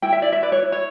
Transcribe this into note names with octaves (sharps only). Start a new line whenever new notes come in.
E4 G5
E5
E4 D5
E5
B4 D5
C#5
E4
C#5